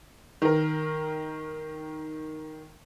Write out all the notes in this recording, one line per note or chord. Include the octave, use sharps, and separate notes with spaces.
D#3 A#4